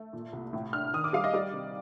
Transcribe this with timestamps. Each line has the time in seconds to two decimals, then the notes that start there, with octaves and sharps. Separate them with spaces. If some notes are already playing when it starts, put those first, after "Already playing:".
Already playing: A3
0.13 A#2
0.33 C2
0.53 A2
0.73 D4 F6
0.93 D#3 D#6
1.04 D6
1.13 G3 F5
1.24 D#5
1.34 G3 D5
1.53 C3